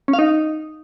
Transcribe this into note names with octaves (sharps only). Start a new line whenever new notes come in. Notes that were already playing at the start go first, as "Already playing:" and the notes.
C#4
F5
D#4